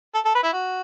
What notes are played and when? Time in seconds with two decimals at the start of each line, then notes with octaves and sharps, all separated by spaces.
0.14 A4
0.25 A4
0.35 B4
0.43 E4
0.53 F#4